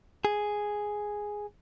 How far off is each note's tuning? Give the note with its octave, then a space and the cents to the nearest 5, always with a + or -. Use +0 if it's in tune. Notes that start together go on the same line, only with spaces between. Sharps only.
G#4 +0